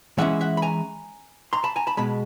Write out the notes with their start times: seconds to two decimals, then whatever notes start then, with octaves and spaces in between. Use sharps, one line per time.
0.18 A2 E3 G#3 C#4 E4 E5 F#5
0.41 E5 F#5
0.57 B5
0.62 G#5 A#5
1.53 A#5 C6
1.64 A5 B5
1.76 G#5 A#5
1.87 A5 B5
1.97 B2 G#3 A5 B5